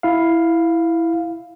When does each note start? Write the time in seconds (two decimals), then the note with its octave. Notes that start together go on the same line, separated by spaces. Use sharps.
0.03 E4 F5